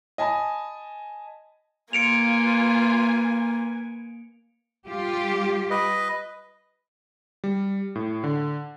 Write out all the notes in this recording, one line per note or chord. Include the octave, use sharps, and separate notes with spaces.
D#5 G#5 A5 B5
A#3 F4 B4 G#5 C#7 D7 F7
G3 F4 G4
B4 D#5
G3
A2
D3